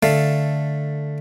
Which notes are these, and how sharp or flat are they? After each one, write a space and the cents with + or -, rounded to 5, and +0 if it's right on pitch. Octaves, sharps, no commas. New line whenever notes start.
D3 +0 A3 +0 F5 +0